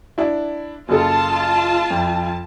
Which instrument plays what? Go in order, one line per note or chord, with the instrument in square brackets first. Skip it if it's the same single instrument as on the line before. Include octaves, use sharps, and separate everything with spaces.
[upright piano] D4 E4
[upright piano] F#1 A4 [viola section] F4 A5
[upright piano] F2